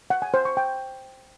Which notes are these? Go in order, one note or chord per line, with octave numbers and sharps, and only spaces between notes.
F#5
G#5
C5
C#6
G5